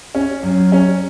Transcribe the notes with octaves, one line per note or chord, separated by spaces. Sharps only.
C#4
F#2
C#4